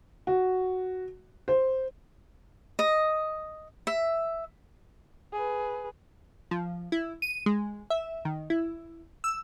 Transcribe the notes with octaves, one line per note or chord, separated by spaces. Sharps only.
F#4
C5
D#5
E5
G#4 B4
F3
E4
D#7
G#3
E5
D#3
E4
E6